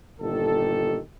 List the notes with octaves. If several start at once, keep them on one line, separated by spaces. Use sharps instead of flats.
G1 A#2 D#3 G4 A4